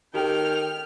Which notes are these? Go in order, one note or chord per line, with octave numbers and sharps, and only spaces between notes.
D#3 G4 A4 G5 F6